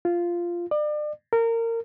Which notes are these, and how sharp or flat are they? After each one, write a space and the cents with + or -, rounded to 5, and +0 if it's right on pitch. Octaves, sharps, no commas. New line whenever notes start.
F4 -10
D5 +35
A#4 -25